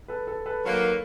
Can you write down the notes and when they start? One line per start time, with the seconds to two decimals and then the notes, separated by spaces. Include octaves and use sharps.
0.08 A4 B4
0.27 A4 B4
0.46 A4 B4
0.64 D#3 F#3 A#3